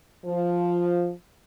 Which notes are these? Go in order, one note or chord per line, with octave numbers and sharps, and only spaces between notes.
F3